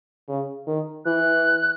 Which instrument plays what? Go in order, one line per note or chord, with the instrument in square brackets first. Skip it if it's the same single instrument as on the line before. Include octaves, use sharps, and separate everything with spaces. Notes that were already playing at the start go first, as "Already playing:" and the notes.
[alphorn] C#3
D#3
[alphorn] E3 [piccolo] F#6